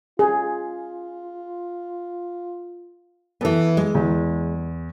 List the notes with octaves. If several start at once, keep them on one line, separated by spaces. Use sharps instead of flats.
F4 G#4
E3 B3 A4 B4
G#3
E2